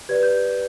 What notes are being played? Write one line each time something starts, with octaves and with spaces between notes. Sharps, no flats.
G4 B4 D5 G#6
G6